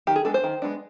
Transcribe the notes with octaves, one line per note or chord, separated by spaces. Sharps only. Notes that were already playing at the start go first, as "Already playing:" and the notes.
D#3 G4
G#4
G#3 B3 D4 A4
C5
D#3
G#3 B3 D4